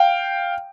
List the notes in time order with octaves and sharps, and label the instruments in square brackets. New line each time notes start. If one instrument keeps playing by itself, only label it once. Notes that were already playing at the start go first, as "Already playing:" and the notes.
Already playing: [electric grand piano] F5 G5